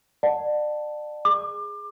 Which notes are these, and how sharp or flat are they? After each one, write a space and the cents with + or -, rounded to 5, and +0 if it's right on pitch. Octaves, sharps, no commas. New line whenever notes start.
D5 +35 F#5 -20 A5 +0
G#4 +0 D6 +30